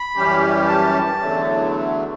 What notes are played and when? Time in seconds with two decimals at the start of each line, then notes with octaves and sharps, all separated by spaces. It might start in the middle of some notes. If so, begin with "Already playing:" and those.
Already playing: B5
0.15 F#2 E3 G3 C#4 G4
0.68 A5
1.19 E2 D3 F#3 A3